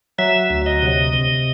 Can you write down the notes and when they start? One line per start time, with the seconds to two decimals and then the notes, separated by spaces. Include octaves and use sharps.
0.18 F#3 E5
0.50 D2
0.66 D#5
0.82 C3
1.13 C3